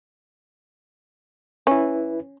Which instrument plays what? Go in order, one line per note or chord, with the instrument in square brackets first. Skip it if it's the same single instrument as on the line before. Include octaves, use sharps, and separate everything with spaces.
[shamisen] C#4 [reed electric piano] E4 B4